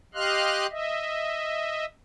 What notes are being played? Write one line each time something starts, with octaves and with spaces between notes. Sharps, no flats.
G4 D#5 F5 C6 F6 F#6
D#5 E5